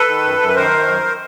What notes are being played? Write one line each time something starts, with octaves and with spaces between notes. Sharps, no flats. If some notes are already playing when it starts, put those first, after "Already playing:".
Already playing: A4 B4
D#3
F#2
F#2
B4
D#3 A#4 C5
D#3
F#2